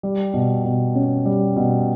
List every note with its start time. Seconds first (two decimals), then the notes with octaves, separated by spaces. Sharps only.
0.03 G3
0.34 B2
0.65 B2
0.95 C#4
1.26 G3
1.56 B2